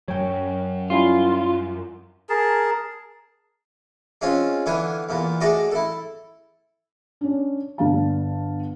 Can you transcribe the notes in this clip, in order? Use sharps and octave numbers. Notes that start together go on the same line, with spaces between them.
F#2 F#3 C#5 G5
G3 C#4 E4 F4
G#4 A#4 A5
G#3 C4 C#4 F4 G#4
D3 E3 B3 F5 G#5
E2 A#2 B3
G#3 A3 F#4 D5 D#5
E4 A4
C#4 D4
G1 D3 D4 F5 A5